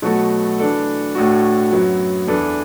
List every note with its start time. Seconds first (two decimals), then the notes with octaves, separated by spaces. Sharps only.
0.02 B2 F#3 A3 F#4 A4
0.59 E3 D4 A4
1.15 A2 A3 D4 F#4
1.71 F#2 F#3 B3
2.27 E2 E3 D4 A4